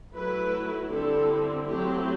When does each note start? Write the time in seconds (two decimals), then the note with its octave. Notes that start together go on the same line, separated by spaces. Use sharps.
0.14 F#3 A3 E4 B4
0.91 D3 G3 C4 E4 A4
1.68 F#3 A3 C4 E4 G4